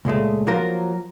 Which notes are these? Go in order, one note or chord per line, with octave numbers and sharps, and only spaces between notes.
C#2 A#2 G#3 A3
F3 F#3 A#3 F4 A#4 C5